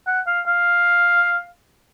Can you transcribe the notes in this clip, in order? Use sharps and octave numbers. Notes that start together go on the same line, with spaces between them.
F#5
F5
F5